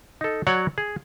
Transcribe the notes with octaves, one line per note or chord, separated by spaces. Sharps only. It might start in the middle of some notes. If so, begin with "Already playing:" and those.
D#4 A4
F#3 C#5 D5 F#5
G#4